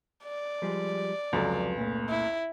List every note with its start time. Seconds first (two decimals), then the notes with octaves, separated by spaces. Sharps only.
0.24 D5
0.62 F3 G3 G#3
1.33 F1 C#2 F3 F#3 A4
1.78 A#2 A3
2.10 E4